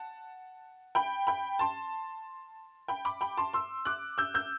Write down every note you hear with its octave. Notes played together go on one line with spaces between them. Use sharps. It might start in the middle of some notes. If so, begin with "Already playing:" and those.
Already playing: F#5 A5
G5 B5
G5 B5
A5 C6
G5 B5
B5 D6
G5 B5
A5 C6
C6 E6
D6 F#6
E6 G6
E6 G6